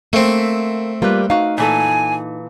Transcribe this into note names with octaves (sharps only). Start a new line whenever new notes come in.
A3 A#3 C4 E5
G3 A#3 F4 B4
D#4 F#4 F5
A#2 E3 A4 G#5